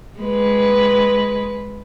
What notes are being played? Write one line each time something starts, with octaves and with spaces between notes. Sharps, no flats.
G#3 B4